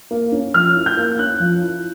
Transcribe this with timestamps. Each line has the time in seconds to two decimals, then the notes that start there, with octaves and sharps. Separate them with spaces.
0.11 A#3
0.32 C#4
0.54 F3 F6
0.76 E4
0.86 G6
0.97 A#3
1.19 C#4 F#6
1.40 F3
1.62 E4